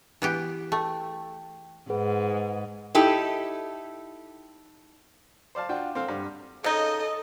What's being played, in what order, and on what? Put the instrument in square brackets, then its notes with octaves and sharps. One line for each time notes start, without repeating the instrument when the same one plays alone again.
[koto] E3 B3 G4
[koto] A3 [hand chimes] G5
[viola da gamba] G#2 [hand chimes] G#4 B4 F#5
[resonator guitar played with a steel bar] D#4 E4 G4 A4
[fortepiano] C5 D5 F5 A5
D4 F4 F#4 G5
C4 A4 F5
G2
[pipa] C#3 D#4 [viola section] A4 [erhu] D#5